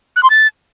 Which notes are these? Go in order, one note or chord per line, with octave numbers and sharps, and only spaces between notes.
F#6
C6
A6